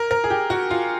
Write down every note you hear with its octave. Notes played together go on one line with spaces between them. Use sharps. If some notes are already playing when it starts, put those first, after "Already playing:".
Already playing: A#4
A#4
G#4
G4
F#4
F4